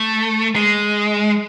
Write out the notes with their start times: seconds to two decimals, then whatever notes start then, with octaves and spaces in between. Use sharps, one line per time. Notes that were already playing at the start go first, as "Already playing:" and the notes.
Already playing: A3
0.55 G#3